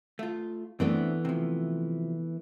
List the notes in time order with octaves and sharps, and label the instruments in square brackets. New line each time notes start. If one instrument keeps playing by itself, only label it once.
[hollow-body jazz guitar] A3 F4
[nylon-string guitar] E3 A3 B3 [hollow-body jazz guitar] C4 D4
[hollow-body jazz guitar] C3 F3